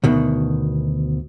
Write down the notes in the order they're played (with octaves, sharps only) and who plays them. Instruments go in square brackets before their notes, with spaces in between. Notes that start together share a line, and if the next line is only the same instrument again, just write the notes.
[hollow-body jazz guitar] D2 B2 D#3